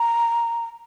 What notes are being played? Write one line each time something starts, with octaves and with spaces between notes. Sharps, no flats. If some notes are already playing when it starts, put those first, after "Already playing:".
Already playing: A#5